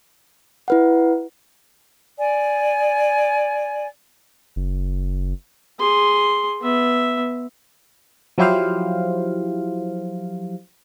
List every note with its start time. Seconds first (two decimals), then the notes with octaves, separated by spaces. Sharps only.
0.68 E4 B4 F#5
2.18 D5 G#5
4.56 F#1
5.80 G#4 C6
6.61 B3 E5
8.38 F3 F#3 E4 G4 C5 F5